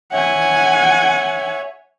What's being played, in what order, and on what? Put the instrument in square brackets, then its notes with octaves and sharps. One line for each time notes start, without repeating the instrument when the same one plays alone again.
[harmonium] C#5 E5 [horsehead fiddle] F#5 G#5